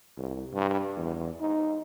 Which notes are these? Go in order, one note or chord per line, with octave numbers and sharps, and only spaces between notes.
C2
G2
E2
D#4